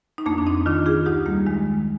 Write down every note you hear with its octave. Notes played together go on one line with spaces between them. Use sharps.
D#4
F2 A#3 D4
D4
C4 D#4
D#3 D4 F4
F4 G#4
D2 D#4 G4
G3 A#3
D#3 G#3